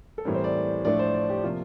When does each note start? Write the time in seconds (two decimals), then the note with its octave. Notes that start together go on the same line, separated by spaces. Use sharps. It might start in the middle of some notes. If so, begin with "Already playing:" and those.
0.18 A4
0.25 A2 E3 G3 C4 A#4
0.34 C5
0.44 D5
0.85 A2 F3 A3 D4 D5
0.99 C5
1.14 D5
1.29 G4
1.44 C3 F3 A#3 F4